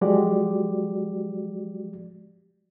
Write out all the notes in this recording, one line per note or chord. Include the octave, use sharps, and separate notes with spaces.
F3 F#3 G#3 F#4 G4 D5